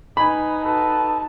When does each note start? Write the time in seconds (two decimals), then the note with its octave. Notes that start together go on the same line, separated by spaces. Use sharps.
0.17 D#4 B4 G#5 B5
0.64 F#4 A4 B4 A5